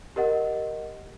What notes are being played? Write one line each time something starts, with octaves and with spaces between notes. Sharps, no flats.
G4 A#4 D#5 F#5